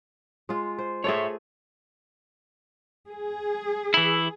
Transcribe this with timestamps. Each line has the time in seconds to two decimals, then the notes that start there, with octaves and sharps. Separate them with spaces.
0.49 G#3 F4
0.78 C5
1.04 A3 F4 G#4 C#5 D5 E5
3.08 G#4
3.94 E3 E4